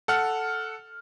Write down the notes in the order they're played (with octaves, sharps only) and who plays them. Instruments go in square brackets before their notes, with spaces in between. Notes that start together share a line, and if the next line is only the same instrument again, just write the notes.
[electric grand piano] A4 F#5 F6